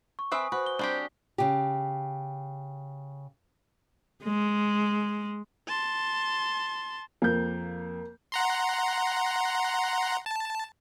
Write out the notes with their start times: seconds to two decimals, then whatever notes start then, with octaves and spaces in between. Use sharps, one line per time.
0.19 C#6
0.32 C4 B4 E5 G#5 D#6
0.52 F#4 B4 C5
0.66 G7
0.79 G3 C4 D4 G4
1.38 C#3 G4
4.24 G#3
5.68 A5 C6
7.22 F2 A#3 G6
8.32 F#5 A#5 C6
10.26 A5